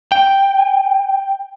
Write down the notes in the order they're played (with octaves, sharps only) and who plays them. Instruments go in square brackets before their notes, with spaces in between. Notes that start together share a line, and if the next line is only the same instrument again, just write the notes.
[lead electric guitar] G5